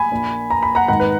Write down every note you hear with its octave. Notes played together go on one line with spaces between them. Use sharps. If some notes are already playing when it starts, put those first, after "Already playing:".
Already playing: G#5 B5
A#1 A#2
A#5
B5
F#5 A#5
G#1 G#2 D#3 F#5 A#5
B4